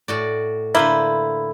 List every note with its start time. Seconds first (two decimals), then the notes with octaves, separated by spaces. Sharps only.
0.08 A2 F#4 D5
0.75 D3 A#3 E4 B4 C5